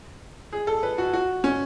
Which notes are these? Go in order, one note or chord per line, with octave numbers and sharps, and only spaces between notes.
G#4
A4
B4
F#4
F#4
C#4